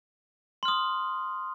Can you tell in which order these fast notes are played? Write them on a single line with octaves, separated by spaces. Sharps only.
C6 F6 D#6